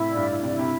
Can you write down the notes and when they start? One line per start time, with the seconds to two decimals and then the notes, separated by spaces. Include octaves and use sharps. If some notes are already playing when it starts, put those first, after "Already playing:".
Already playing: A2 C3 E4
0.10 D5
0.16 G2
0.30 E4
0.42 C3
0.49 E4
0.59 C3